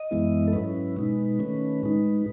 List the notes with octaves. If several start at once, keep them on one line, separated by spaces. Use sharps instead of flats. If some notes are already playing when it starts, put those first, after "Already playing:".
Already playing: D#5
F#2 E3 G#3 B3 E4
A4
G#2 F#3 C#4 E4 B4
B2 G#3 D#4
D#3 A3 C#4
A2 G#3 D#4